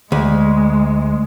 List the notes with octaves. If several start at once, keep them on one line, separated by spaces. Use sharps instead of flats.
D2 G#3